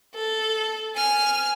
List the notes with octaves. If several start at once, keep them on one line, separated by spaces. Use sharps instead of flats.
A4
G#5 F6